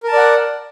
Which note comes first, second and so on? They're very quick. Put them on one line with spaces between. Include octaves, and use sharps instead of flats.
A#4 A5 D5 F#5